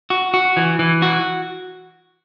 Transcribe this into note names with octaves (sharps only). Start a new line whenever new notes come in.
F#4
F#4
E3
E3
F#4